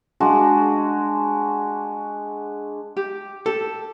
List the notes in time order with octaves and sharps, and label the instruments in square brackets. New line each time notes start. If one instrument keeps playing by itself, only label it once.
[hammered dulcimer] G#3 D4 F#4
[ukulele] G4
[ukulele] G4 [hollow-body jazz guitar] A4